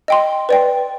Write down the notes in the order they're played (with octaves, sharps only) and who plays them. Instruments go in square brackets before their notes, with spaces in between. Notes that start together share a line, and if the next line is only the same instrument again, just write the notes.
[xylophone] D#5 G5 C6
B4 D5 G5